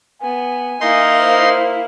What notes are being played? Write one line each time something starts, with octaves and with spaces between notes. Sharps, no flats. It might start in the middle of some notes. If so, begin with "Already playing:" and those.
B3 G#5
A#3 D#4 E4 C6
C5